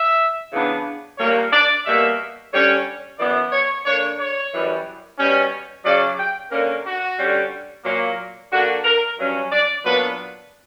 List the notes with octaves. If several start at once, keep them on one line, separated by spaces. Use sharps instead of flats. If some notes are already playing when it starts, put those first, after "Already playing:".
Already playing: E5
C#3 E3 B3 D4
A#2 G3 A#3 D4 C#5
D5
B2 G3 A#3 E5
D3 G3 C#4 C#5
F#2 E3 B3 D5
C#5
D3 A#3 D4 C#5
C#5
F#2 E3 G3
B2 G3 C#4
C#3 F#3 C#4 D5
G5
D3 A#3 C#4 A#4
F#4
D3 G3 C#4
A#2 F#3 A#3
D3 A#3 D4 F#4
A#4
G2 F#3 C#4
D5
A#2 F#3 B3 D4 B4